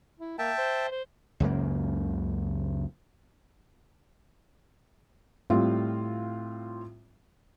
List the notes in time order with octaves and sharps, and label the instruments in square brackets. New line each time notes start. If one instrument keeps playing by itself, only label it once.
[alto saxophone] E4
[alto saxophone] A#3 [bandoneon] E5 G5 A5
[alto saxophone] C5
C5
[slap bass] C#2 F#2 C#3 A#3
[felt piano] A2 G3 C4 F4